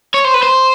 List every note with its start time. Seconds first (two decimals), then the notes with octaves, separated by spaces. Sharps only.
0.14 C#5
0.25 C5
0.34 B4
0.42 C5